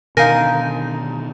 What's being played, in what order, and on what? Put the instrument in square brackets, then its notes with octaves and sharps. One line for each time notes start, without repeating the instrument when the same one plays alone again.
[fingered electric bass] B2 D#3 [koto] D3 D#4 [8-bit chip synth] A#4 G#5 [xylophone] F5 A#6